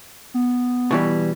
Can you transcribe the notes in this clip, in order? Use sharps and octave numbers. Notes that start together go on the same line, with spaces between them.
B3
B2 E3 G3